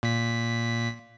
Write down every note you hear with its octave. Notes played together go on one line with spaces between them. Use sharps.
A#2 B6